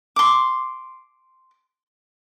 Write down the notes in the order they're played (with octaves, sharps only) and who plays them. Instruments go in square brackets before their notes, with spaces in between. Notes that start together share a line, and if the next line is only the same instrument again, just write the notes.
[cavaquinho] C6 D6